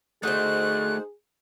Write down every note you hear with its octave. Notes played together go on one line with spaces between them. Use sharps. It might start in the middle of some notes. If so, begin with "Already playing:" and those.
A3 D#4 F#4 G#4 C5 F#6